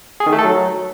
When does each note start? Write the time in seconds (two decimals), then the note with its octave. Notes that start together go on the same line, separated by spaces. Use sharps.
0.20 G#4
0.26 D#3
0.32 A3
0.39 A4
0.45 F#3